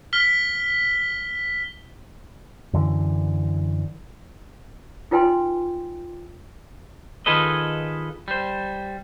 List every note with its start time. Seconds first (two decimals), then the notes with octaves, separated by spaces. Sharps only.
0.13 F6 B6 G7
2.73 F#2 D3 E3
5.11 D#4 F4 B4 G5 G#5 C6
7.26 D#3 F4 G#4 A4 B4 D#5
8.28 G3 C5